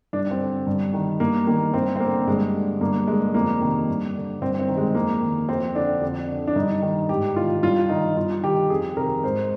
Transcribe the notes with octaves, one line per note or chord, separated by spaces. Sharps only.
G2 D4
C4
D3
G2
D#3
G2 A#3
D#3 A#3
G2 C4
C4
D3 A#3
G2 G#3
D3
G2 A#3
D3 G#3
F2 A#3
C3 D#3
G2
D3
G2 C4
C4
D#3
G#3
F2 A#3
D#3
F2 C4
D3 D4
F2
D3
D4
G2 D#4
D#3
G#2 G4
D#3 F4
G2 F4
D#3 D#4
G2 F4
D#3 G4
F2 G#4
C3 D#3 A#4
G#2 C5